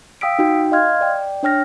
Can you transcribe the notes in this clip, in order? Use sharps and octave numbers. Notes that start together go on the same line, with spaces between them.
F5 G5 D#6 E6 B6 D7
D#4 F#4 G5
D#5 F5 C6 F6 G#6
D5 G5
D4 C#5 G5 F6 A#6